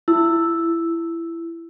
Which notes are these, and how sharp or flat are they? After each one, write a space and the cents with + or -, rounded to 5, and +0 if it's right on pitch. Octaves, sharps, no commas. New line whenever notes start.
E4 +20 E6 +0